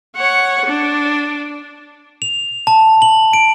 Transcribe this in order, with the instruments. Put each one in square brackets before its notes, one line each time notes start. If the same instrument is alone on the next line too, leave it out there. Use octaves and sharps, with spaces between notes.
[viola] C#5 F#5
D4
[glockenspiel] F7
A5
F#7
D7